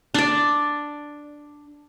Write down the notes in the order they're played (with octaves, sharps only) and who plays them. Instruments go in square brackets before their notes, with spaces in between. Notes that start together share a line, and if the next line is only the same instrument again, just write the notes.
[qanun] D4 D5